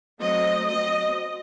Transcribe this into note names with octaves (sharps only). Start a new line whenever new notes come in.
F#3 A3 C4 D#5
F#3 C4 D#5